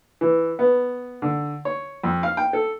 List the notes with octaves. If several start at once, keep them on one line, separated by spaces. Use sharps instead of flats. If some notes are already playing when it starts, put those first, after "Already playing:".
E3
B3
D3
C#5
F2
F5
G5
A4